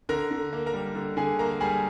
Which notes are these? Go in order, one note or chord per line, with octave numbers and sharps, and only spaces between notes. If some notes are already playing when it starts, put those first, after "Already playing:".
D3 A#4 A#5
D3
A#3
A#4 A#5
G3
D3
D3 G#4 G#5
A#3 A#4 A#5
G3 G#4 G#5